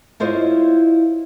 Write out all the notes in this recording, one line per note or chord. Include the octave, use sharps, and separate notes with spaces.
E4 F4 C5 C#5 D#5